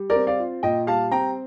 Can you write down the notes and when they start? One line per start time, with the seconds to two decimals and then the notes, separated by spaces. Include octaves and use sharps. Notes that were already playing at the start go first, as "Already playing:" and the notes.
Already playing: G3
0.10 A#4 D5
0.15 C4
0.27 D5 F5
0.39 F4
0.63 A#2 D#5 G5
0.87 G3 F5 A5
1.11 C4 G5 A#5